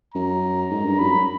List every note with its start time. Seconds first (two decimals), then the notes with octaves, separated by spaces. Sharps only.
0.14 F#2 A#5
0.70 G#2
0.85 G2
0.99 F#2 B5